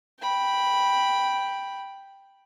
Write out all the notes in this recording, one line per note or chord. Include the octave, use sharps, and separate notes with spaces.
G5 B5